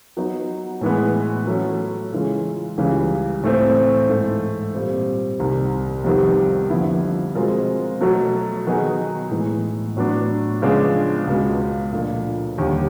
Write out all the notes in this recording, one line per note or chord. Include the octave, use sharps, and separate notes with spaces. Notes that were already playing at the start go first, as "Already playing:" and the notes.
F#3 B3 D#4 F#4
A2 E3 G#3 B3
F#3 A3 C#4
C#3 E3 G#3 C#4 F4
C#2 C#3 E3 G3
A2 E3 A3 C4
G#2 E3 A3
A#2 G3 C4
C2 C3 D#3
F2 C3 D#3 G3 B3
F2 D3 G3 B3 E4
B2 G#3 C4 F4 A#4
B2 F#3 A3
D#3 F#3 B3 D#4 G#4
A2 E3 G#3 B3
A2 F#3 B3 D4
C#3 F3 G#3 B3 D4
C#2 B2 G#3 B3
A#2 F3 A3 D4
D#2 D3 G3